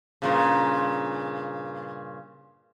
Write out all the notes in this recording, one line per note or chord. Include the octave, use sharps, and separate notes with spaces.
G2 A#2 C#3